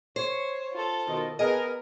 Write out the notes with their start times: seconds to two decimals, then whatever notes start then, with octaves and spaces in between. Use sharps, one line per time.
0.16 C5 C#5
0.72 F4 A4
1.07 B2 D#3 D#5
1.39 B3 G#4 A#4 D#5